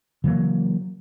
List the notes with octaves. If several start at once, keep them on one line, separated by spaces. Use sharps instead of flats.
C#3 E3 F#3 A#3